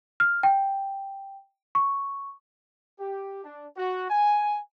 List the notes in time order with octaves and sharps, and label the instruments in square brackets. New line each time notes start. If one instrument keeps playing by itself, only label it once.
[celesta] F6
G5
C#6
[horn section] G4
D4
F#4
G#5